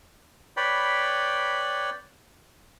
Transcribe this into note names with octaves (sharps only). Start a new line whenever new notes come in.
B4 C#5 D5 G5 B5